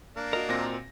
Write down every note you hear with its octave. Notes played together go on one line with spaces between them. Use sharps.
A#3 D4
F#4 A#4 D#5
A#2 C4 A#6